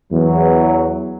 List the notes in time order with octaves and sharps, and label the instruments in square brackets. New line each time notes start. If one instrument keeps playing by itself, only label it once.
[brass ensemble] E2 F#3